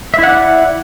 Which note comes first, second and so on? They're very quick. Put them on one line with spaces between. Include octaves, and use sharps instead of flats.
E5 E4 F#5 D5